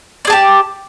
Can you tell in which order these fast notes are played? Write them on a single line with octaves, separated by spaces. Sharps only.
D5 G#4 A5 G4